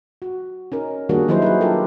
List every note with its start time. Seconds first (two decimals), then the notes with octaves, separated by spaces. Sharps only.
0.22 F#4
0.72 C#4 D#4 A#4
1.09 D#3 G3 A#3 D4 F#4 G#4
1.28 D#3 F#3 D#4 E4 B4 C5
1.42 F#4 G#4 B4
1.61 D4 F4 G4 A4 A#4